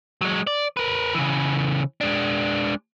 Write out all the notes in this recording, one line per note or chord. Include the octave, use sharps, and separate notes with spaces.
F#3 G#3
D5
A#4 B4
C#3 E3
G#3 D4